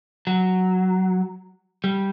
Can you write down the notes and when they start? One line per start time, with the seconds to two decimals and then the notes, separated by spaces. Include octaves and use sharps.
0.27 F#3
1.84 G3